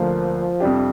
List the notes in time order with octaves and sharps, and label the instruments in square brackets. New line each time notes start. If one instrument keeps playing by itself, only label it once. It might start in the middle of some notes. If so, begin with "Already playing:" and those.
Already playing: [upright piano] D2 D3 A#3 D4 [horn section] F3
[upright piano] F2 C3 G3 D4 G4